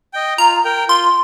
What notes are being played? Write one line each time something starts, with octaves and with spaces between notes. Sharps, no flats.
D#5 G5
F4 A#5
A#4 G5
F4 C6